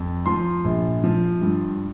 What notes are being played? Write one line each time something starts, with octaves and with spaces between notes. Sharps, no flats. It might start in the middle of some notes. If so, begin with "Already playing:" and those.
Already playing: F2
F3 C6
A#1
F3
G2